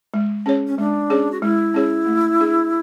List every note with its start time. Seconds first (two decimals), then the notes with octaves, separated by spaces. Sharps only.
0.14 G#3
0.46 C#4 G#4 C#5
0.67 C#4
0.78 G#3 D4
1.10 C#4 G#4 C#5
1.31 F#4
1.42 G#3 E4
1.74 C#4 G#4 C#5
2.06 A3
2.39 D4 G#4